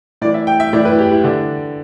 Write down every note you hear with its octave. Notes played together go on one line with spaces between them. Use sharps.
A2 E3 D5
E5
G5
E5
A2 E3 D5
B4
E4
G4
E4
D3 D4